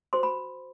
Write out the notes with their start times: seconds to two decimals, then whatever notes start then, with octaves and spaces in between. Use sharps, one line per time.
0.13 F#4 C5 C6
0.23 B5